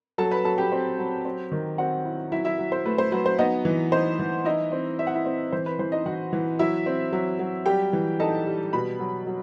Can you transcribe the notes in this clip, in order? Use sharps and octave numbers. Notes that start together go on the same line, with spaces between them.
F#3 A4 A5
B4 B5
F#3 A4 A5
G4 G5
C4
F#3
C4
D#3
C4 F#4 F#5
E4
F#3 E4 E5
E4 E5
F#3
C5
A3 B4
C5
F#3 B4
C5
B3 D#4 D#5
E3
D#4 C5
E3
D#4 E4 D#5
C4
C4 E5
F#5
E4 E5
C4
E3 C5
B4
E3 C5
D#4 D#5
E3 F#4 F#5
E3
F#3 E4 E5
C4
F#3
F#3
G3 G4 G5
E3
D#4 A4 A5
G3
B2 B4 B5
F#3
F#3